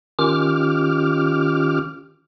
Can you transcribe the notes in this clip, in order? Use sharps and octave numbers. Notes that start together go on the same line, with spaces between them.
D#3 C#4 F4 G4 D6 F6